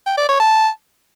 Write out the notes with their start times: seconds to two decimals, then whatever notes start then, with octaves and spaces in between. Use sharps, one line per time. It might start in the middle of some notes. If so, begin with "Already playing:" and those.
0.06 G5
0.17 D5
0.29 C#5
0.40 A5